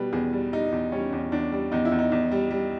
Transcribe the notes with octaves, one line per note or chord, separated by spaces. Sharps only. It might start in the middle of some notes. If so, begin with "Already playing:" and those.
Already playing: B2 G3 B4
E2 G#4
G3
G3 D#4
E2
G3 C#4
E2
E2 D4
G3
E2 D#4
E4
E2
D#4
E2
G3
G3